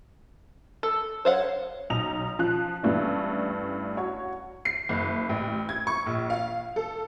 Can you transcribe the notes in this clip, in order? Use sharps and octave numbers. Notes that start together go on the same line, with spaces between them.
A4
C5 C#5 F5 F#5
B1 D#4 F7
F3 F#6
G2 E3 A3 B3 C#4 D4
F#4 C#5
C7
F#1
A1
G#6
C#6
A#1
F5
A4